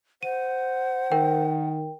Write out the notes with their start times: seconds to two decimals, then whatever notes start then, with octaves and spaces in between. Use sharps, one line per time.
0.23 C5 F#5 D#7
1.12 D#3 A#4 G5